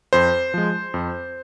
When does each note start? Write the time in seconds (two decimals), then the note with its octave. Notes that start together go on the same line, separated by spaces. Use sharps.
0.13 F2 C5
0.54 F3 G#3
0.94 F2